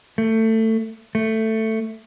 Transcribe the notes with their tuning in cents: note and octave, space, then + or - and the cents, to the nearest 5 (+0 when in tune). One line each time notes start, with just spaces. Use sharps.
A3 +20
A3 +10